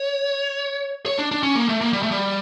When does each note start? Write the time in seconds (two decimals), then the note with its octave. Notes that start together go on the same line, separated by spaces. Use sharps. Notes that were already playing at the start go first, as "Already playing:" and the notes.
Already playing: C#5
1.06 C#5
1.19 D4
1.32 D4
1.43 C#4
1.55 A#3
1.69 A3
1.81 A#3
1.93 G3
2.03 A3
2.11 G3